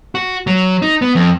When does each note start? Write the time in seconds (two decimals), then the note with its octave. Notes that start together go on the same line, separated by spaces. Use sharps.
0.15 F#4
0.47 F#3
0.82 D#4
1.02 B3
1.15 F2